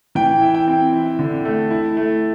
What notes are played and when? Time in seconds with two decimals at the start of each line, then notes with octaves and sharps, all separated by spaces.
0.15 E3 G5
0.41 E4
0.54 G5
0.68 C4
0.93 E4
1.19 D3
1.45 A3
1.71 E4
1.97 A3